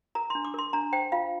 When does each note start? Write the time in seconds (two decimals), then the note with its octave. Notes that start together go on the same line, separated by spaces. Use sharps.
0.15 A#4 A#5
0.30 D4 C6
0.45 D6
0.54 A#4 C6
0.73 D4 A#5
0.93 C5 G5
1.12 F4 F5